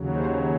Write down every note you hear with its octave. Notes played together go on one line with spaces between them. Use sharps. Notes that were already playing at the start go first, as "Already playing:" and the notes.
Already playing: D#2 C#3 F#3
C5